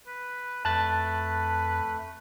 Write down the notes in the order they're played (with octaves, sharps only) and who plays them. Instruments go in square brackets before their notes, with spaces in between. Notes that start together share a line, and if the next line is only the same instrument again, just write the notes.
[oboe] B4
[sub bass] F2 [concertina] A3 [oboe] B4 [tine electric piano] A5 F#6 A6